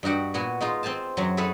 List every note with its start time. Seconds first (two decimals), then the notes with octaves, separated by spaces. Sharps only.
0.03 G2 D#4 F#4 G4 F#5
0.34 A#2 B3 F#4 G#5
0.61 G#3 D#4 F4
0.83 C4 C5 F5 G#5 A5
1.17 F#2 F#3
1.37 E4 G#4 A4 B4 C#5